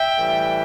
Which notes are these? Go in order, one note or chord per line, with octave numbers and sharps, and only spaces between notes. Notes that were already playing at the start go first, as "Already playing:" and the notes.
Already playing: E5 G5
A2 E3 G3